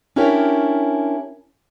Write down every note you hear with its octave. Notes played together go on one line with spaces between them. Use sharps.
C#4 D4 E4 G4 A#4 C#5